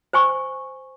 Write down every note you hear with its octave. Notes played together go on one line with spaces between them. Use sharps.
C5 G#5 C#6